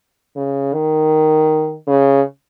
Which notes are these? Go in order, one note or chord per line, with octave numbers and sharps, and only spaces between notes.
C#3
D#3
C#3